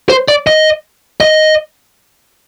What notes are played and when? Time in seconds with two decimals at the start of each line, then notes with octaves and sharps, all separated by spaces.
0.10 C5
0.28 D5
0.47 D#5
1.20 D#5